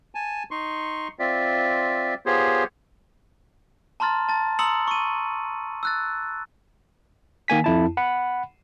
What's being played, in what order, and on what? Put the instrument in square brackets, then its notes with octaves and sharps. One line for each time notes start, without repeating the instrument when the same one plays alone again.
[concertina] G#5 A5
D#4 C6 C#6
C4 F4 D5 E5
B3 F4 G4 G#4 C5 C#5
[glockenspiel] A5 A#5 C6 F6 A6
A5 A6
A#5 C6 D#6 E6 C#7 F#7
C#6 D#7
E6 F#6 A6
[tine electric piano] D#3 A#3 G#5 B6
F2 E4 A5
F#5 B5